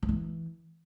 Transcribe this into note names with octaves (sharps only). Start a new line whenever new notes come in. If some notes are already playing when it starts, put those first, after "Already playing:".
F3
E3